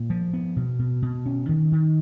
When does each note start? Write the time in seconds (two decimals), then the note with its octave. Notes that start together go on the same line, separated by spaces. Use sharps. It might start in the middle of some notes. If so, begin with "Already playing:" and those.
Already playing: A#2
0.10 F3
0.33 B3
0.56 B2
0.79 B2
1.02 B2
1.26 C#4
1.49 D#3
1.72 D#3